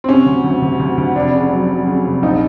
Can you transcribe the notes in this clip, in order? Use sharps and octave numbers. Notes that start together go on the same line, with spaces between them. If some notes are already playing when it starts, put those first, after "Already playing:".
C4
C3 C#4
D2
D2
D2
D2
D2
F1 D4
C#3
F#3
F#3
C#3
F1
A#1 D#4